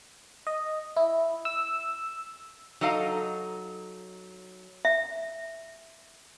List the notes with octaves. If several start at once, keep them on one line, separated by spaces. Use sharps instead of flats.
D#5
E4
E6
F#3 D#4 A4 D#5 F5
E5